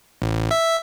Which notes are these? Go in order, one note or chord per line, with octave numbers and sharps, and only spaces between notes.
A1
E5